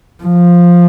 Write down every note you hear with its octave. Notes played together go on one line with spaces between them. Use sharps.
F3